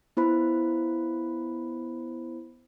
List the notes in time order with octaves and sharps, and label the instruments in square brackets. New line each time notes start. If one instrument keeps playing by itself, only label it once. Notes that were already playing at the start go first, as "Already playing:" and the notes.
[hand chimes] B3 E4 C5 B5